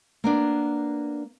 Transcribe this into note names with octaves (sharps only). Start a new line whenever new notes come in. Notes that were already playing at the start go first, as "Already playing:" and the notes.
A#3 B3 D4